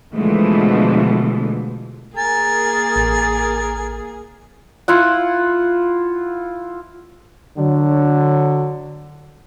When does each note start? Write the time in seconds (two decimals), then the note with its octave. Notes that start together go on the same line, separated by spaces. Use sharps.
0.14 B2 D3 E3 F3 G#3 A3
2.17 A#3 G#4 A#4 G#5 A6
2.96 A1
4.88 E4 F4 F#5
7.58 D3 F#3